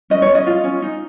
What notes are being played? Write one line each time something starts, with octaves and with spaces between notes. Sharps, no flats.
C#4 D#5
C#5
C#4
D#5
F4
C#4
D#4